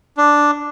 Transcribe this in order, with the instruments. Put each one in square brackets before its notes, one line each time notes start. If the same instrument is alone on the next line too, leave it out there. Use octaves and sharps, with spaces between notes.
[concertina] D4